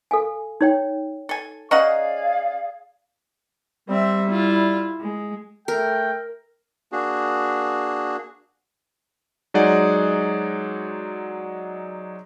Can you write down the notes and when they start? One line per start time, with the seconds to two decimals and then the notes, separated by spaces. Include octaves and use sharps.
0.11 A4 F5 G#5
0.61 D#4 C#5 G5
1.29 A4 G#5
1.71 C#4 G#4 D5 D#5 F5 F#5 A#5
3.89 G3 C4 E5
4.29 E4 F4
5.00 G#3
5.68 A3 A4 A#4 G5
6.92 A#3 D4 F#4 G#4
9.54 F#3 G#3 D#4 G#4 D5 F#5